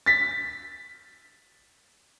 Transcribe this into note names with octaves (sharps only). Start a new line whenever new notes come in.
A6 B6